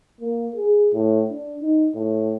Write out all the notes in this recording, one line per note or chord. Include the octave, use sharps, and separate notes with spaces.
A#3
G#4
A2
D4
D#4
A2